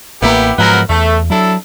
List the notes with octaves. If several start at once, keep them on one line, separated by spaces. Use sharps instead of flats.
A1 A#3 B3 E4 G4
G#2 F3 F#3 G#3 B3 A#4
E2 A3
F#3 D4 E4 A4